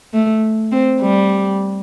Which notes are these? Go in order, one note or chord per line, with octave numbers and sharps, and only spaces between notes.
A3
C4
G3